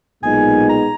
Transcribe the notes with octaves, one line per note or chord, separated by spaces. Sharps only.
B1 A#2 G#3 B3 D#4 G#5
A#5